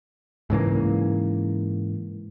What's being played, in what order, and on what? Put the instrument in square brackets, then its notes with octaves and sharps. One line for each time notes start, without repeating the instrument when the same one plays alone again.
[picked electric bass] G#2 C#3 E3 A#3